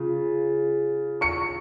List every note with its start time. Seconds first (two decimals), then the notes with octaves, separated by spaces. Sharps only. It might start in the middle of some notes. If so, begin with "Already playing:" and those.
Already playing: C#3 F4
1.21 C#6 C#7